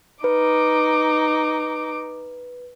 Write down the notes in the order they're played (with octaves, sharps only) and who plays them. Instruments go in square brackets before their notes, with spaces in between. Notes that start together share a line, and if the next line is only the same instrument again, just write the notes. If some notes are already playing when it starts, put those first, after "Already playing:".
[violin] D#4 D6 [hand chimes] B4